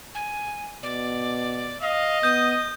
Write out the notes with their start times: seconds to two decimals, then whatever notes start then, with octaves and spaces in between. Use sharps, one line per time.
0.15 G#5
0.83 B2 D5
1.81 D#5 F5
2.23 B3 D#6 G6